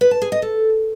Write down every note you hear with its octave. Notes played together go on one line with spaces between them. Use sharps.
B4
A5
G#4
D#5
A4